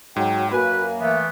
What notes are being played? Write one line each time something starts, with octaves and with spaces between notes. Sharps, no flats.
G#2 F#3 G5
F#2 A#3 F#4 B4 G#5 B5
E3 A3 B3 E5